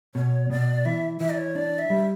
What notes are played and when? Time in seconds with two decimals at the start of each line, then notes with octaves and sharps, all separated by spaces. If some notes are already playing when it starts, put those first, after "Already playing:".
0.15 B2 C#5
0.50 B2 D5
0.85 E3 E5
1.20 E3 E5
1.30 D5
1.38 C#5
1.55 D4 D5
1.79 E5
1.90 G3